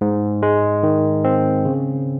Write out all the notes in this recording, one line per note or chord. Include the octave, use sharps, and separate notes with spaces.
G#2
G#3
D#3
C4
C#3